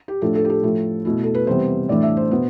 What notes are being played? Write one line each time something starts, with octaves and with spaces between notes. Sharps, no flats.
G4
A2 F3 A3 D4 A4
A4
G4
A4
A2 F3 A3
B2 A3 E4
A4
B4
C3 E3 G3 B3 C5
A2 E3 A3 D4 D5
E5
C5
B2 B3